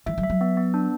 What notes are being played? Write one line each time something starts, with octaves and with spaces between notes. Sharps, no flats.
E3 E5
F#3
E5
F#3
B3
B3
D4